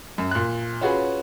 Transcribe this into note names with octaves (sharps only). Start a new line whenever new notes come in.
F#2
A#2 F#6
C#4 F4 F#4 G#4 B4